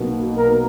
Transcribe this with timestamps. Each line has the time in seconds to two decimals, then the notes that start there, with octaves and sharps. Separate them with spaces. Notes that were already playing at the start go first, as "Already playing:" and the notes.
Already playing: B1 B2 A#3
0.36 A#4